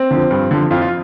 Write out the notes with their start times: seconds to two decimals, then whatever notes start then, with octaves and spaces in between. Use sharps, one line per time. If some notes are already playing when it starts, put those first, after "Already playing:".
Already playing: C4
0.11 D3 F3
0.31 G2
0.51 D3 F3
0.71 F2 F4
0.81 F4